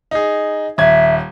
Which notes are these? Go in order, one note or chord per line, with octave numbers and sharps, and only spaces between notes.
D#4 G#4
D#1 E5 G#6